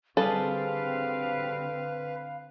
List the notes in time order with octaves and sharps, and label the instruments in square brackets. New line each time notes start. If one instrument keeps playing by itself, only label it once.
[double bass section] D3 C4 [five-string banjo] G3 G#4 A4 [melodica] B4 [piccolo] F5